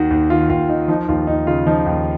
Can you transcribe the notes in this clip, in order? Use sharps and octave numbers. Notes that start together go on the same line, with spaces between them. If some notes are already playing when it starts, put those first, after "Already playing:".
Already playing: D#2 D#3 F#4
D#2
D#3 F4
D#2 F4
D#3 D#4
F3 D#4
D#2 F4
D#2 D#4
C#3 F4
F3 D#4
D#2